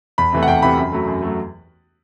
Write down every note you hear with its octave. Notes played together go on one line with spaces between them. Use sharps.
E2 B5
C3 E3 A3
F#5
E2 G5
C3 E3 A3 B5
F#2 B5
F#3 A3
F#2
F#3 A3